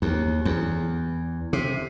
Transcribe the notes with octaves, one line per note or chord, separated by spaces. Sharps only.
D#2
E2
C3